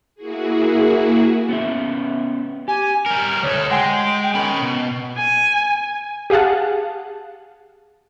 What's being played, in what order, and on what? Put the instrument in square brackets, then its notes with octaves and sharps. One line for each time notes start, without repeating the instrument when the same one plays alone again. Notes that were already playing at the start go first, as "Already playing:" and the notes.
[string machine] A#3 E4 F#4 G#4
[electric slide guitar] B3 C#4 E5
[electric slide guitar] G4 [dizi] G#5
[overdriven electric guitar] G3 A#4
[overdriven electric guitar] D2 A4 [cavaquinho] D#4 B4 D#6 [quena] C#5
[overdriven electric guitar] G#3 [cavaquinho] F#4 G#4 C6 [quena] G5
[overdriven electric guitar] C#4 B5 [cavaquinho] A#4 D#5
[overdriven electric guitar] B2
[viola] G#5
[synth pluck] G4 G#4 F5 F#5 A5